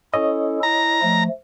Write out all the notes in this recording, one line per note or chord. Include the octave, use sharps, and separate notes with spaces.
C#4 E4 A4 C#5 D#5
E4 A#5
F3 A3